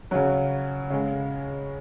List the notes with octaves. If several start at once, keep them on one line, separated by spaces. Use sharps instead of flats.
C#3 F#3 C#4
C#3 G#3